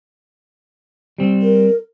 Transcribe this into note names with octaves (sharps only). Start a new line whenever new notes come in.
G3 C4
A#4